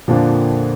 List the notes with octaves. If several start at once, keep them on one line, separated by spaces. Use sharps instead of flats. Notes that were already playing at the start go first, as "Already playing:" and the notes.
F2 A#2 D3 F3 A#3 D4